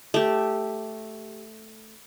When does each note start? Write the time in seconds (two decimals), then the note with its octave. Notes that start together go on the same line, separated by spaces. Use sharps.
0.14 A3 G4